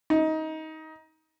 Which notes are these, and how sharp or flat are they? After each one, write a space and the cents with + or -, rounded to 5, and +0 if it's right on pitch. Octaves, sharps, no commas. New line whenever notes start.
D#4 +20